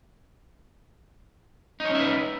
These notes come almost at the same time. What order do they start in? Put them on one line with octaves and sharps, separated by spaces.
D#4 C#5 C#4 E5 B4